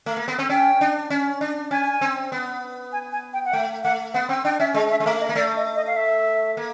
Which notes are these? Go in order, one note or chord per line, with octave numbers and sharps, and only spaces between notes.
A3
A#3
B3
C4
C#4 G5
D4
C#4
D4
C#4 G#5
C4
B3
G#5
G#5
G5
F#5
A3 G5
A3 F#5
B3 F#5
C4 G5
D4 G5
C#4 E5
G#3 D#5
E5
G#3
A3 E5
D#5
A#3
A3 D5
D#5
D#5
F5
E5
A#3